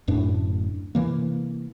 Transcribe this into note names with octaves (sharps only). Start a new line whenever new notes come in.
D1 F#2 A2 D4
C3 E3 A#3